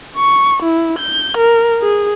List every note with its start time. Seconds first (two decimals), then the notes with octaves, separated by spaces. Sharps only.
0.17 C#6
0.63 E4
0.99 G6
1.37 A#4
1.82 G#4